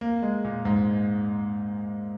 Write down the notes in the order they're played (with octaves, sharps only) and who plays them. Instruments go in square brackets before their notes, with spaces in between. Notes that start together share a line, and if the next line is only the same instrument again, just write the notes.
[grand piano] A#3
G#3
A#2
G#2